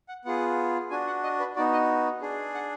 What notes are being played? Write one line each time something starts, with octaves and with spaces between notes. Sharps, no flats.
F#5
B3 F4 G#4 F#5
D4 F#4 G#5
F#5
D#5
B4
B3 D#4 F#4 D5
D#5
D4 G#4
F#5